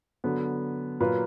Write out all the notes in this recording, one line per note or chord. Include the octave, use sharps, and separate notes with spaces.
D3 F#3 B3
A#2 F#3 A#3 F4 B4